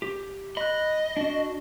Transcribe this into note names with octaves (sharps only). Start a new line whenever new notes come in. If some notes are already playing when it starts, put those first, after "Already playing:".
G4
D#5 B5 F#6
D4 F#4